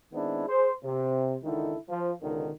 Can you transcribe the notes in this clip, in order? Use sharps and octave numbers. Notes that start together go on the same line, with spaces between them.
D#3 G#3 B3 C4 D4 E4
G#4 C5
C3
C#2 D3 D#3 D#4 E4 A4
F3
C#2 B2 D3 D#3